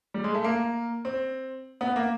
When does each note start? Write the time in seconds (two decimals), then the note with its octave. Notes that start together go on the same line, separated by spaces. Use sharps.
0.14 G3
0.24 G#3
0.34 A3
0.44 A#3
1.05 C4
1.81 B3
1.96 A#3